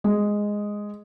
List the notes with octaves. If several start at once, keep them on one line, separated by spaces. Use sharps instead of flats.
G#3